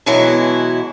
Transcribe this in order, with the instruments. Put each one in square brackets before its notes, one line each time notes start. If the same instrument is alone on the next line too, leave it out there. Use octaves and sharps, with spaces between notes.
[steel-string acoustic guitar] B2 E3 F#3 G#3 E4